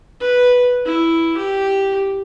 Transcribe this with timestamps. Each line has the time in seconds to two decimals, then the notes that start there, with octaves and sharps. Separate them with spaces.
0.20 B4
0.86 E4
1.37 G4